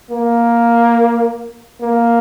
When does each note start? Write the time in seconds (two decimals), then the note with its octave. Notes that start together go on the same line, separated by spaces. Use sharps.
0.11 A#3
1.81 A#3